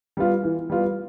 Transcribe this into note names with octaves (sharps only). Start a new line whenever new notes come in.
G3 B3 F4
E3
G3 B3 F4